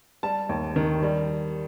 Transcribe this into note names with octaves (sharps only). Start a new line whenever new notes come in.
G3 A5
D#2
D#3
G3